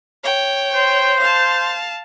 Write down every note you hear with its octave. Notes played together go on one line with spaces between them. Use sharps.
C#5 G5
C5
F5 A5